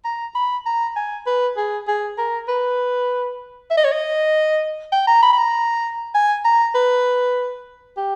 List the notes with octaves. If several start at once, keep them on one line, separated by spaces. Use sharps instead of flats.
A#5
B5
A#5
G#5
B4
G#4
G#4
A#4
B4
E5
D#5
C#5
D#5
G5
A#5
B5
B5
A#5
G#5
A#5
B4
G4